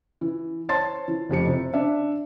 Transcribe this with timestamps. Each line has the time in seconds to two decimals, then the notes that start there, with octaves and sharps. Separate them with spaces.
0.21 E3
0.69 C5 C#5 A5 C6 A6
1.08 E3
1.29 F1 F2 G4 C#7
1.47 C3
1.74 D4 D5 E5